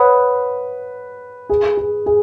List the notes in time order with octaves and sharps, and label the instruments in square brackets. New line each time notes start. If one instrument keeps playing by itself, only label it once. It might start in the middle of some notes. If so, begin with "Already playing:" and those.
Already playing: [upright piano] B4 [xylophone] C#5 F#5 B5 D#6 F#6
[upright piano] G#4
G#4
G#4